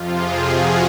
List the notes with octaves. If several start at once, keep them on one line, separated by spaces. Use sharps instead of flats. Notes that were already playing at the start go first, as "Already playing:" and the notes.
Already playing: F2 C3 F3 F4
G#4
F#4